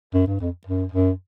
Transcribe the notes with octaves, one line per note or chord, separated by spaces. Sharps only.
F#2
G2
F2
F#2
F#2